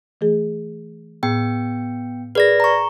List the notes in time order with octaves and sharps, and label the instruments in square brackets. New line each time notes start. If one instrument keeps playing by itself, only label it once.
[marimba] E3 A3 G#4
[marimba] A2 [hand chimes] B3 G5
[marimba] G#4 A#4 [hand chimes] B4 D5 A#6
[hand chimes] A#5 C#6